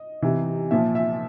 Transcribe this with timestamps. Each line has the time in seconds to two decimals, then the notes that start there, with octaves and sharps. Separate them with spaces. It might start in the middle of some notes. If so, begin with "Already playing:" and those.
Already playing: D#5
0.22 C3 E3
0.71 A#2 F3 E5
0.95 E5